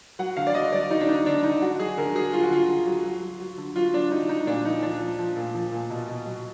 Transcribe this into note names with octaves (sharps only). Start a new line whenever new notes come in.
F#3 F#5
D3 F5
D5
F#3 D#5
F#3 D5
F#3 D#4
D4
F#3 D#4
D3 D4
D3 D#4
F#3 F#4
F#3 G#4
D3 A#4
F#3 G#4
F#3 F4
F#4
D3 F4
D3
F#3
F#3
F#3
F#3
D3
F#3 F4
F#3 D4
F#3 D#4
F#3 D#4
A#2 D4
F3 D#4
F3 D4
F3
F3
A#2
F3
A#2
B2
B2
F#3